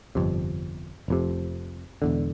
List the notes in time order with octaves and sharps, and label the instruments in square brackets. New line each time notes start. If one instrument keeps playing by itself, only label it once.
[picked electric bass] G1 F2 C3
F1 F2 C3
E1 E2 D3